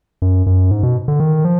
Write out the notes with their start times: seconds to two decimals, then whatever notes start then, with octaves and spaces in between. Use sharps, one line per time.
0.22 F#2
0.46 F#2
0.71 G#2
0.83 B2
1.08 D3
1.20 D#3
1.45 F3